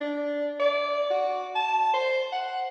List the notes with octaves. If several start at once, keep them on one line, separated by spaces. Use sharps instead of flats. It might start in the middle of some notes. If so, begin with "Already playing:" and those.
D4
D5
F#4
A5
C5
F#5